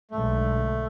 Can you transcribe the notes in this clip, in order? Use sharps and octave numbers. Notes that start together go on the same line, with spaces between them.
B1 D3 G#3 A3